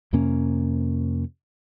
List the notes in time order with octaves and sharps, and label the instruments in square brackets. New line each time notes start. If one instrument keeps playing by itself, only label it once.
[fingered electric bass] F2 C3 A#3 C#4